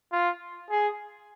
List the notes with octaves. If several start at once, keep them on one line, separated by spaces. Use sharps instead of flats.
F4
G#4